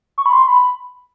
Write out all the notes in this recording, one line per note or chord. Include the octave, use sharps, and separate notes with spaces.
C#6
B5
C6
B5